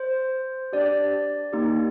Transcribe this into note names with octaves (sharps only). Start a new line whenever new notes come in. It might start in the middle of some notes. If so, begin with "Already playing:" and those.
Already playing: C5
D4 G4 D5
A#3 D#4 G4